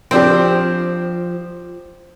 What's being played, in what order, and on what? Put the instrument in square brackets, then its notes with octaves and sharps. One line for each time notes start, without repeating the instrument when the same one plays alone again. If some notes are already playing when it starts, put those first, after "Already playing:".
[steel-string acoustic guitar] F3 [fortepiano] C4 D4 G4